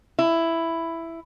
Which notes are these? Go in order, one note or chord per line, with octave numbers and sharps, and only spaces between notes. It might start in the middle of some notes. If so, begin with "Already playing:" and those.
E4